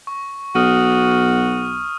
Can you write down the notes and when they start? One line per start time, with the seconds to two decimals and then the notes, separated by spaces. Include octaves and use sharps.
0.07 C#6
0.55 B1 F#4 D#6 F6 D#7